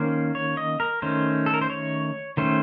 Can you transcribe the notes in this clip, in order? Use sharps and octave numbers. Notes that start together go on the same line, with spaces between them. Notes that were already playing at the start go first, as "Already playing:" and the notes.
Already playing: D#3 A#3 C#4 C5
C#5
D#5
A#4
D#3 A3 C#4 C5
A4
A#4
C5
C#5
D#3 A3 C#4 C5